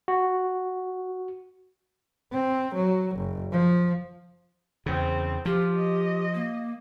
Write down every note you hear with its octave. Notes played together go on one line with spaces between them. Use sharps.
F#4
C4
F#3
F#1
F3
E2 C#3 C4
F3 F4 G4
D#5
A#3